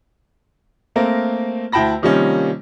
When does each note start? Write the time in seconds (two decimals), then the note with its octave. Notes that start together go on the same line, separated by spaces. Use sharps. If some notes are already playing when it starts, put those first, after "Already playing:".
0.96 A3 A#3 C4 A#4
1.72 D2 E4 G5 A5 B5 A#6
2.02 C3 D#3 F3 G3 A#3 C#4